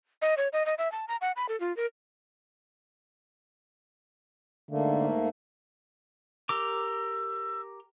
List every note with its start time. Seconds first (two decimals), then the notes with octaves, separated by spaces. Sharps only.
0.22 D#5
0.37 C#5
0.53 D#5
0.66 D#5
0.78 E5
0.92 A5
1.08 A#5
1.21 F#5
1.36 B5
1.49 A4
1.60 F4
1.77 A#4
4.71 G#2 D3 A3 A#3
6.49 G4 A#4 D6 E6